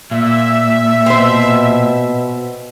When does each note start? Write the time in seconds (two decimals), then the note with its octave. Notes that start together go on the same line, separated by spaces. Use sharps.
0.11 A#2 E5
1.06 B2 C4 C5